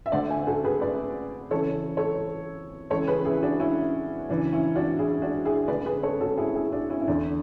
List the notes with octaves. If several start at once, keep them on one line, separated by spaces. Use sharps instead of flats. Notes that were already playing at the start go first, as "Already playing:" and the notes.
E5
D2 D3 D5 F#5
E5 G#5
F#4 A4
G#4 B4
B4 D5
F#2 C#3 E3 A4 C#5
A4 C#5
C#2 C#3 E3 A4 C#5
G#4 B4
E4 G#4
D4 F#4
C#4 E4
F#2 C#3 E3 D4
C#4 E4
D4 F#4
E4 G#4
D4 F#4
E4 G#4
D2 D3 B4 D5
G#4 B4
A4 C#5
F#4 A4
E4 G#4
E4 G#4
D4 F#4
C#4 E4
E4
E2 D3 D4